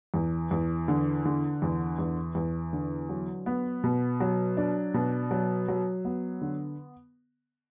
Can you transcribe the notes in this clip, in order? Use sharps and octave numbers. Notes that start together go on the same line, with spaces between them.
E2
E2
D3
D3
E2
E2
E2
D3
F#3
B3
B2
F#3
D4
B2
F#3
F#3
B3
D3